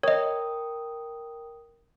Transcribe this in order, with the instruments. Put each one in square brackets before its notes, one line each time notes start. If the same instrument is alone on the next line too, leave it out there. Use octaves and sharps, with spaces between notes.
[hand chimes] A#4 G5 D#6 [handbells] C#5 D#5